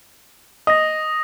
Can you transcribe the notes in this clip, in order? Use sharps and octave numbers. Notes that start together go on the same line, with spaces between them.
D#5 D#6 A#6